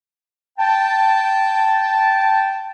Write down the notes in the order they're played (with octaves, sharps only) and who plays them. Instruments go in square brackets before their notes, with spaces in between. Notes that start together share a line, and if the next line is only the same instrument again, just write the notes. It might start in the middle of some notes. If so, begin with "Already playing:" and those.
[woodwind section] G5 A5